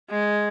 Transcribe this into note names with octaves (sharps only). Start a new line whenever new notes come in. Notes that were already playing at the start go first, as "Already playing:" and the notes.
G#3